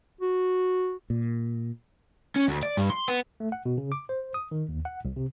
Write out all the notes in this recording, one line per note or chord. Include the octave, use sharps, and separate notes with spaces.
F#4
A#2
C#4
D2
D5
G2
C6
B3
A3
F#5
B2
C#3
D6
C5
D#6
D#3
D#2
F#5
C2
C3